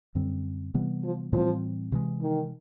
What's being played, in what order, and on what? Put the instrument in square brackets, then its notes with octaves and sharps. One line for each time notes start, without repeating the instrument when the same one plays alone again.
[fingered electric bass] F#2 D3 G3 C4
C3 E3 G3 B3
[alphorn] F3
[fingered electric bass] A2 E3 G3 C4 [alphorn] F3
[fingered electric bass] C3 E3 G#3
[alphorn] D#3